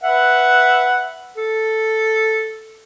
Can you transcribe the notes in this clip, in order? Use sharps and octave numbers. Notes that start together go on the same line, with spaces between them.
B4 E5 F#5
A4